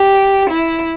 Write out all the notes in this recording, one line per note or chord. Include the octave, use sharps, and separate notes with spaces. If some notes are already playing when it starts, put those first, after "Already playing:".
Already playing: G4
E4